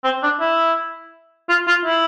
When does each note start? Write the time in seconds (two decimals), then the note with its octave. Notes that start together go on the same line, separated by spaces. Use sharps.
0.04 C4
0.23 D4
0.40 E4
1.49 F4
1.67 F4
1.85 E4